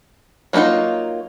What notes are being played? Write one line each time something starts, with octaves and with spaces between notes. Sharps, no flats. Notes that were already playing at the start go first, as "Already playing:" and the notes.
F#3 A#3 C#4 D#4 F4